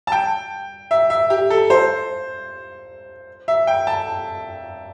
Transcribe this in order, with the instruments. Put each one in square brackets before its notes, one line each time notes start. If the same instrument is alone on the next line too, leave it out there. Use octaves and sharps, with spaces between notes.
[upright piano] A5
G5
E5
E5
G4
A4
C5
E5
G5
A5